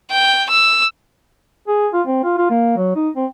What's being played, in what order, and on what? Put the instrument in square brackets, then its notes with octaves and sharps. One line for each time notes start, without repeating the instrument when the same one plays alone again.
[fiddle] G5
E6
[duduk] G#4
F4
C4
F4
F4
A#3
F#3
D#4
C4